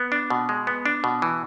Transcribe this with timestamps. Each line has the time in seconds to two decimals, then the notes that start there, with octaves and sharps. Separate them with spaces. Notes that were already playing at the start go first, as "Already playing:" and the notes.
Already playing: B3
0.12 D4
0.30 B2
0.49 G#3
0.67 B3
0.86 D4
1.04 B2
1.22 E3